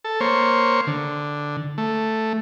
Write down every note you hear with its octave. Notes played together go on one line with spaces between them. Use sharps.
A4
A#3 C5 C#5
D3
A3